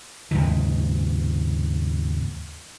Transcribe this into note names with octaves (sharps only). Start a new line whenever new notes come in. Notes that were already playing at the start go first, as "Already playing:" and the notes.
D#2 G#2 C#3 E3